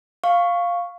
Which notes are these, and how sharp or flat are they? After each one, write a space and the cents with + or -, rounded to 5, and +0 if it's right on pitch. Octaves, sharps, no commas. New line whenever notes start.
F5 +0 C#6 +0